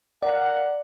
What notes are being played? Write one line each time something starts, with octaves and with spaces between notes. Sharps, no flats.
A#4 D5 F5 F#5